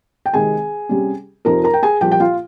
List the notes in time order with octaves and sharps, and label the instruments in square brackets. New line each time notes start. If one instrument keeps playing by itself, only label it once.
[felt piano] G5
C3 D#3 G#3 C4 G#4 G#5
C3 G3 C#4
F2 C3 F3 C4 D#4 A#4 A#5
A#4 A#5
G5
G#4 G#5
C2 A#2 F3 A#3 G4 G5
G5
F4 F5